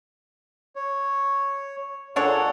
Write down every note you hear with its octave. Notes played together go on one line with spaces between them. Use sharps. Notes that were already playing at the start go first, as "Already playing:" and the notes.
C#5
A#2 G#3 D4 A4 C#5 F#5